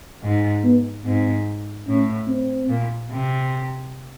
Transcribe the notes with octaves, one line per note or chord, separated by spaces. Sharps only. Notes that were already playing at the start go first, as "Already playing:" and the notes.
G#2
B3
G#2 C4
A2 C#4
C4
A#2
C3